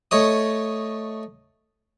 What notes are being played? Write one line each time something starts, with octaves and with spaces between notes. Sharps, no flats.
A3 C#5 D#5 D#6